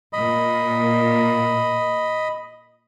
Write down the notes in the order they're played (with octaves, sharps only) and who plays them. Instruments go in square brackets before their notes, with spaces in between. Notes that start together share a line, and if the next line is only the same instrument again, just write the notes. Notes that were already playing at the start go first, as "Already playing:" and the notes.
[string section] A#2 [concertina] D#5 B5